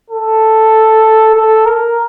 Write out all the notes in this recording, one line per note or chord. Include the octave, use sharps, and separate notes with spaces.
A4
A4
A#4